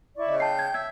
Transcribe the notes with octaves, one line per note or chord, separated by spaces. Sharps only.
E4 D5 C#6
C#3 D#5
G5 A5 G6 C7
G#6
E5 G#6